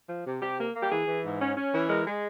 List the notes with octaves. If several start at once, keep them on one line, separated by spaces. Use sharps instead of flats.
F3
C3
C3 G4
A#3
A#3
G4
E3 G#4
E3
G#2
C#4
C#4
E3
G#3 A#4
G#3